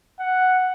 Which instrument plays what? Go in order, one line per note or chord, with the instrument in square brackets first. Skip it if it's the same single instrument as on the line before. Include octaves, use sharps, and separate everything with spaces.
[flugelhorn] F#5